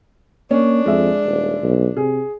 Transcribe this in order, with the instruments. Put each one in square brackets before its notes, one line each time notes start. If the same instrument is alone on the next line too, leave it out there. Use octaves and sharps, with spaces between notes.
[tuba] A#3 [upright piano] C#4 [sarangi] D4
[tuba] F2 [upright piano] G#3 E5
[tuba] D#1
B1
[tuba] C3 [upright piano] G#4